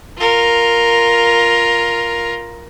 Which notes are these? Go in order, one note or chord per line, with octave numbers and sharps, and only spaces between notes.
F4 A#4